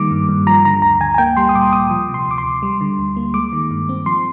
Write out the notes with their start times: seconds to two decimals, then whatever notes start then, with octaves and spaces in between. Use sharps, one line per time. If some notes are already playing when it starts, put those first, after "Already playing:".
Already playing: D#3 G3 A#3 D6
0.11 G2
0.29 G2
0.47 F3 A#5
0.65 D3 A#5
0.82 D2 A#5
1.00 D2 G#5
1.14 G#5
1.18 A#3 G5
1.37 G3 C6
1.49 D#6
1.55 A#2 D6
1.72 A#2 D#6
1.90 F3
2.09 C3
2.14 C6
2.27 D2 D6
2.38 C6
2.45 D2
2.62 G3
2.81 D3
2.99 D2
3.16 A#3
3.34 G#3 D6
3.53 D#3
3.71 G2
3.89 C4
4.06 F3 C6